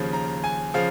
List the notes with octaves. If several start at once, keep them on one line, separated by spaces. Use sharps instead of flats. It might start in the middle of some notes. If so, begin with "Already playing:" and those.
Already playing: D#2 C#3 F3
A#5
G#5
C#3 F3 F5